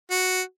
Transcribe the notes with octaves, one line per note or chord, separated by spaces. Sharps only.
F#4